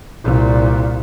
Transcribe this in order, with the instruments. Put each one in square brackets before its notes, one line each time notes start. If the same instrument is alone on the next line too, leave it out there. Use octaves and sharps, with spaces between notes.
[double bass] C2 A#2